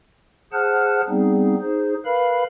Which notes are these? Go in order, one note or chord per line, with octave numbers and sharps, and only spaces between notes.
G#4 C5 F#5 A5 F6 F#6
G3 B3 C4 D#4 G#4
D#4 G#4 C5
A#4 B4 F5 B5